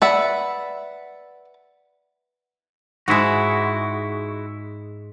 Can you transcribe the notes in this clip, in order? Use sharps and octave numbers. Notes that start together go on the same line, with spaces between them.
B4 D5 E5 F#5
G#2 G#3 E4 F#4